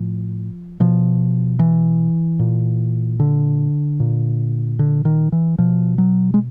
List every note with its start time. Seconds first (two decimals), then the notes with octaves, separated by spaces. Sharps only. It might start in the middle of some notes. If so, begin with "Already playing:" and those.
Already playing: A2 F3
0.80 B2 F3
1.59 E3
2.39 A#2
3.20 D3
4.00 A#2
4.79 D3
5.05 D#3
5.32 E3
5.58 B2 F3
5.98 F#3
6.34 G#3